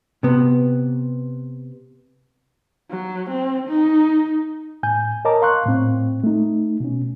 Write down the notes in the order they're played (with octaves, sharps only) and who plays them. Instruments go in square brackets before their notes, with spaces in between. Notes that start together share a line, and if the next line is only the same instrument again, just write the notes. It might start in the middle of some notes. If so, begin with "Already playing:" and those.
[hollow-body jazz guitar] C3 B3
[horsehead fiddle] F#3
C4
D#4
[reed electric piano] A2 G#5 G6
A#4 C#5 D#5 A5 A#5 D6
F5 C6 C#6 F#6
A2 C4
A3 D#4
B2 C#4